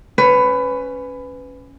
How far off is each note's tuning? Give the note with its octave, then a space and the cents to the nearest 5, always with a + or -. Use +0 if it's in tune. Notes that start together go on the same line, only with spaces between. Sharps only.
C#4 +0 B4 +20